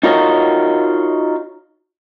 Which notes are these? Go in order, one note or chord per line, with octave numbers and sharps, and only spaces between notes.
D#4 F4 F#4 A#4 C#5 D#5